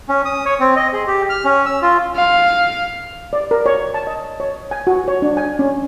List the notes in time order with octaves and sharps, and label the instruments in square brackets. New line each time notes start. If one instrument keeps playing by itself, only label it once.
[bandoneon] C#4
D#6
C#5
C4
D#5
G#4
G4
F6
C#4
E6
F4
[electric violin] F5
[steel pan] D5
A#4
C#5
A5
D#5
C#5
G#5
F#4
C#5
D4
G#5
C#4